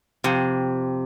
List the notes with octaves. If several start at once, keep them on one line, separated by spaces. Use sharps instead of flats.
F2 C3